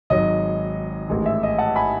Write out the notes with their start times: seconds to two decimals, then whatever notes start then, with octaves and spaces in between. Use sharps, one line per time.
0.10 G#1 G#2 F#3 D#5
1.09 A1 G#2 D#3 G#3
1.26 E5
1.43 D#5
1.58 F#5 A5
1.76 G#5 B5